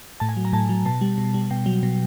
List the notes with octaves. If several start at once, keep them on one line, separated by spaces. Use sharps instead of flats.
A2 A5
G#5
F#3
A#5
A2 A5
F#3
B2 A5
G3
B2
G3
B2 G5
F#3
B2